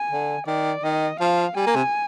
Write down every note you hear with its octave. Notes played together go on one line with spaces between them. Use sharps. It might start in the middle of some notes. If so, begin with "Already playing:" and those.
Already playing: G#5
D3
D#3 D5
D#3 D#5
F3 F5
G3 G#5
A#3
C3